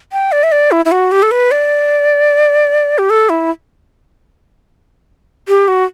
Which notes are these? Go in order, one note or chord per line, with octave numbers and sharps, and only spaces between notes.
G5
D5
E5
D5
E4
E4
F#4
G4
A4
B4
D5
G4
A4
E4
G4
F#4